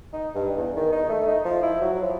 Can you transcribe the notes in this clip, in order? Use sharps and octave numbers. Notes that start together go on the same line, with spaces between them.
D#4
G2
E2
D#3
D#4
A3
D#4
F3
E4
F#3
F3